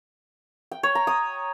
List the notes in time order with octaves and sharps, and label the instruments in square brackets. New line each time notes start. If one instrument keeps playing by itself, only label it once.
[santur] G5
C#5
A#5
D#6